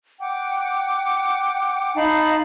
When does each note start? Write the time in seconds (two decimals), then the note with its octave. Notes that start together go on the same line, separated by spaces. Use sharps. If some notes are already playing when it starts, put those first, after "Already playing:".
0.20 F#5 G5 D6
1.95 D#4 F5 A5 B5